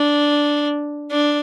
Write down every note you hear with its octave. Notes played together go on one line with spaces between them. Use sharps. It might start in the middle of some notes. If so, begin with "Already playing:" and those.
Already playing: D4
D4